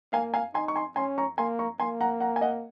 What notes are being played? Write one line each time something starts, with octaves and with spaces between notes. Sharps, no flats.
A#3 F5 G#5
F5 G#5
D#4 G#5 C6
C#6
G#5 C6
C#4 G#5 C6
A#5 C#6
A#3 G#5 C6
A#5 C#6
A#3 G#5 C6
F#5 A#5
F#5 A#5
G#5
D#5 F#5